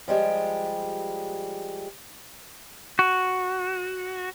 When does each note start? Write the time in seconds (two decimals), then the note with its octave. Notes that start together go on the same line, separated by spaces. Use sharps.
0.08 F3 G3 G#3 G4
2.99 F#4